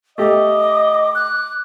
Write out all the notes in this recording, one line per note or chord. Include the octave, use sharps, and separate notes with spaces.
A3 G4 D#5 D6
F#6